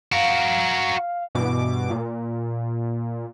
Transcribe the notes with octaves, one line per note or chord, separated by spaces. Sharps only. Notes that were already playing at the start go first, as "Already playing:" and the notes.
F#4 A#4 F5
G2 B2 E3 D6
A#2